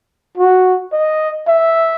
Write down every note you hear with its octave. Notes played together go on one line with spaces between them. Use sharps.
F#4
D#5
E5